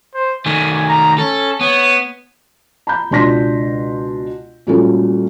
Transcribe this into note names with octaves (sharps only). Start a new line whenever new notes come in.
C5
D#3 A3 G#5
A#5
C#4 A4
B3 C#5
A#5 B5 G6
C#2 B2 D4 C6 A#6 B6
A#2 F#3 G3 A3 C#4 A4